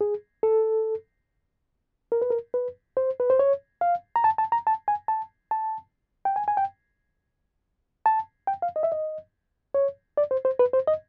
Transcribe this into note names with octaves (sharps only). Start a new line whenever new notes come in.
G#4
A4
A#4
B4
A#4
B4
C5
B4
C5
C#5
F5
A#5
A5
A5
A#5
A5
G#5
A5
A5
G5
G#5
G#5
G5
A5
G5
F5
D#5
E5
D#5
C#5
D5
C5
C5
B4
C5
D#5